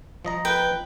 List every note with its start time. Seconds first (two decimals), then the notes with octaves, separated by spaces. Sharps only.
0.25 F3 D#5 A#5
0.45 B4 G5